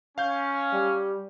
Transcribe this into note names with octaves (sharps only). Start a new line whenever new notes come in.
C#4 F5 G6
G3